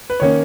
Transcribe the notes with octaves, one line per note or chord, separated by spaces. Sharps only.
B4
D#3 A#3 C#4 C#5